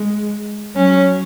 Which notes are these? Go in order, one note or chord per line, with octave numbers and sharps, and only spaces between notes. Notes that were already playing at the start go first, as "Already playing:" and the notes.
Already playing: G#3
F#3 C#4